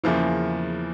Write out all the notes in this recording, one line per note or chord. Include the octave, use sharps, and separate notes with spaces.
E2 C#3 F3 A#3 E4